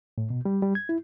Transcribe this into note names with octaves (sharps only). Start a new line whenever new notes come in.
A2
B2
G3
G3
G#6
E4